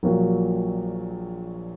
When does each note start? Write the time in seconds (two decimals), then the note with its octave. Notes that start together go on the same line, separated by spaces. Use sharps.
0.03 A#1 A#2 F#3 A#3 F#4